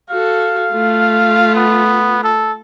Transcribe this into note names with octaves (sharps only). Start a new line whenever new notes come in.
F#4 A4 F5
A3 F4
B3
A4